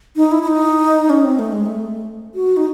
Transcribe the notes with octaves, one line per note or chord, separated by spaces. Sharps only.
D#4
E4
E4
D#4
C#4
C4
A3
G#3
A3
F#4
D#4